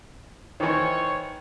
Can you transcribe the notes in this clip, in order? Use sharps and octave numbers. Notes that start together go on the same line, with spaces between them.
D#3 E3 C5 C#5